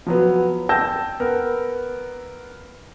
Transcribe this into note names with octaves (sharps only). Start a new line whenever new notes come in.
F3 F#3 B3
G5 A5 E6 G6 A#6
B3 A#4